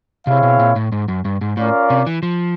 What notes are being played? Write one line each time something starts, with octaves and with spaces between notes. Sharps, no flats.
C3 C4 E4 G#4 C#5 F5
B2
A#2
A2
G#2
F#2
G2
G#2
A2 C#4 F4 A#4 D5 F5
C3
E3
F3